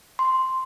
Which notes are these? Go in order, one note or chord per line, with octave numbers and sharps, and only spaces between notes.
C6